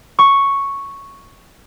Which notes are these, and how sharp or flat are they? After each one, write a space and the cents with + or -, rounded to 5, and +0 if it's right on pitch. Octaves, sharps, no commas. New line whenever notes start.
C#6 +0